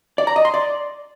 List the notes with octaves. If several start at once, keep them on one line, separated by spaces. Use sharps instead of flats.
D5
A#5
D#5
C6
D5